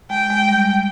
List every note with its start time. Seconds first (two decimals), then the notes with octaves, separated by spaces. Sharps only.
0.10 G#3 G5
0.30 G#3
0.49 G3